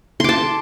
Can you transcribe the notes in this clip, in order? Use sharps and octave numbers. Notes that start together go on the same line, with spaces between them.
A5 C6 D6